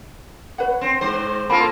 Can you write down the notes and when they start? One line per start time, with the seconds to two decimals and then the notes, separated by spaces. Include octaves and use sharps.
0.58 B4 C#5 F#5
0.81 C4
1.01 G#2 C5
1.49 A#3 F4 A4 A5 B5